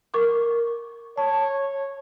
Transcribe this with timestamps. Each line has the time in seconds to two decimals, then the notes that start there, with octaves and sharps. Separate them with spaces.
0.14 A#4 C#6 D6
1.17 C#5 A5